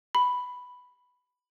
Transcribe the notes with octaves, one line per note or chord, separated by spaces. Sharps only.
B5